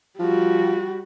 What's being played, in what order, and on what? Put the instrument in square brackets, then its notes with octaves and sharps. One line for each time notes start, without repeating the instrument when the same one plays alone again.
[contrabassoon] F3 [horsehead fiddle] G3 F#4